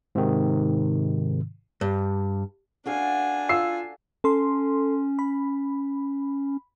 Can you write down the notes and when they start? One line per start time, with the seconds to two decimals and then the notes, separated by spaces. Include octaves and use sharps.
0.15 G#2 C3 D#3
1.81 G2
2.86 D4 F#4 A4 F5 G#5
3.49 F4 E6 C7
4.24 C#4 A4 C6
5.19 B5